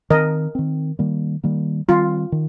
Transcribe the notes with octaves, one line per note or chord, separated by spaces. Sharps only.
D#3 C4 A#4 D#5
D#3 C4
D#3 G3 A#3
D#3 G3 A#3
D#3 G3 C4 F4
D#3